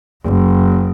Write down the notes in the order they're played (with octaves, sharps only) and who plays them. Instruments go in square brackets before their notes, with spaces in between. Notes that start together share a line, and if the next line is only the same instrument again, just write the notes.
[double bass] F#1